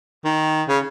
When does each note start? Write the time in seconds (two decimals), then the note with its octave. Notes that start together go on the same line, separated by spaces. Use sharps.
0.25 D#3
0.69 C#3